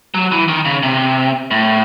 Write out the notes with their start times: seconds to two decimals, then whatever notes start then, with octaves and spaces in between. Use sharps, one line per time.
0.14 F#3
0.32 E3
0.48 D#3
0.65 C#3
0.83 C3
1.51 A2